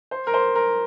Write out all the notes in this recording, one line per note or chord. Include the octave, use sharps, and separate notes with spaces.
C5
A#4
C5
A#4